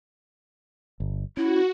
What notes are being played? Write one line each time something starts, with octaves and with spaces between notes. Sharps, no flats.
G1
C#4 E4 F#4